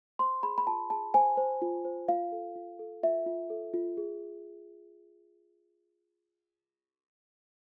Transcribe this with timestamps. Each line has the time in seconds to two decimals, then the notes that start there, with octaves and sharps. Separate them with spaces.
0.19 C5 C6
0.43 G#4 B5
0.58 B5
0.67 F4 A5
0.90 G#4 A5
1.14 C5 G#5
1.37 C5
1.62 F4
1.85 C5
2.08 F4 F5
2.32 A4
2.56 F4
2.79 A4
3.03 F4 E5
3.26 F4
3.50 A4
3.74 F4
3.97 G#4